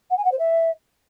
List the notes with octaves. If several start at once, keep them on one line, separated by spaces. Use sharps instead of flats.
F#5
G#5
F#5
C5
E5